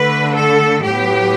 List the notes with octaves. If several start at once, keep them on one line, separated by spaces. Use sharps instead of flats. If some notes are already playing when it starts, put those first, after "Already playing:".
Already playing: D3 A3 B4
A4
A2 F#3 B3 G4